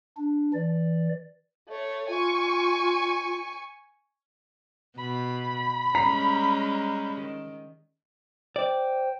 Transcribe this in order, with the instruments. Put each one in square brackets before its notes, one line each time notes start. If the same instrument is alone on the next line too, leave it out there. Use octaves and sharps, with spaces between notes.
[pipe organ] D4
E3 D5
[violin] A3 C#5
[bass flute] F4 [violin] G#5 C#6
[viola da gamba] B2 [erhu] B5
[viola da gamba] G3 G#3 C#4 [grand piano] A#5 B6
[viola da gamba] D#3
[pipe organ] C5 G5 [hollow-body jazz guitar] D5